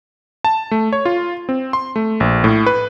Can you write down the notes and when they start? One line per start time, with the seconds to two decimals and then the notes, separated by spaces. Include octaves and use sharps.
0.45 A5
0.71 A3
0.93 C#5
1.06 F4
1.49 C4
1.73 C6
1.96 A3
2.20 A#1
2.44 A2
2.66 B4